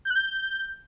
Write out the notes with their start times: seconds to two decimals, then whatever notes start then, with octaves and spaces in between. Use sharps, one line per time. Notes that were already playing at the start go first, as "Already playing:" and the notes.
0.05 G6
0.10 F#6
0.16 G6